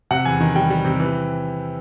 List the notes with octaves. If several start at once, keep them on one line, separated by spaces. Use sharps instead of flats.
C3 F#5
E2 G#5
D#3
G3 G5
G3
C3
E3